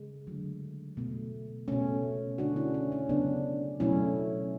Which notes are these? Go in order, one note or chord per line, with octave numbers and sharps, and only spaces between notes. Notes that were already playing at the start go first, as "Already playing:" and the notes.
Already playing: C#3 G#3
D3 F#3 A3
B2 A3
B2 A3 C#4
D3 A3 D4 F#4
C#4 E4
C#4
C#4
C#3 F#3 A3 B3 D4
B2 F#3 A3 C#4 E4